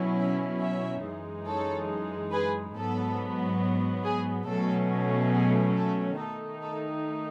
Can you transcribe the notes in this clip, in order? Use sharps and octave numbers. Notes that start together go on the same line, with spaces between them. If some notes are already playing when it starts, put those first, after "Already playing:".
Already playing: B2 F#3 C#4 E4
C#5 E5
C#5 E5
F#2 E3 G#3 D#4
A4 C#5
G#4 B4
G#2 F#3 B3 A4
G#4
B2 F#3 A3 C#4 A4
G#4
A4
D#3 A3 D#4 A4
A4